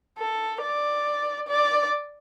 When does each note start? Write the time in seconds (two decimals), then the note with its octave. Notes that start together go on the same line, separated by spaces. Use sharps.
0.19 A4
0.62 D5
1.48 D5